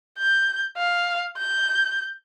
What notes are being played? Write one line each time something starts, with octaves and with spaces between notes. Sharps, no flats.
G6
F5
G6